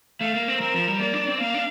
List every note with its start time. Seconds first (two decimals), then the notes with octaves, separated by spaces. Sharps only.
0.20 A3 F5
0.34 A#3
0.48 C4
0.60 C4 A#4
0.74 F3
0.88 G3
1.00 A#3 D5
1.14 D4
1.27 C4
1.40 A#3 F5
1.54 D4